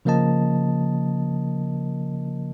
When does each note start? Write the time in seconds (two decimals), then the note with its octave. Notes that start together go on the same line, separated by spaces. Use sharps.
0.05 C#3 F3 A#3 A#4 D#5 A5